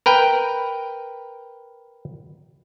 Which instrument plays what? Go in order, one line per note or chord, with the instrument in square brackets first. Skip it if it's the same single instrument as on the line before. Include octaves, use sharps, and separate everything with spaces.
[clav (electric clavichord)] A#4 B4 G5